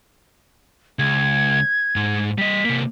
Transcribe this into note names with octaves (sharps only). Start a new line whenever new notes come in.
C#2 G#6
G#2
G3 D#5 B6
C3 A#3